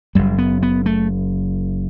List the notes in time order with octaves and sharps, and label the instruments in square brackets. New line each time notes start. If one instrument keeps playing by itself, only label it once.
[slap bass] F#1 F#2 G3
B3
B3
A3